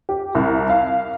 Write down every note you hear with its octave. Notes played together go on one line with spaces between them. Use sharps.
G4
C2
F5